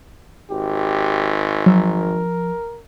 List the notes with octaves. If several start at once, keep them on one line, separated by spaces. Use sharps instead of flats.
G#1 G4
F3 F#3 A#4 E6